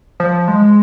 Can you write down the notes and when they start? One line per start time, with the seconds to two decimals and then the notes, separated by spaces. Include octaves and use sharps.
0.20 F3
0.48 G#3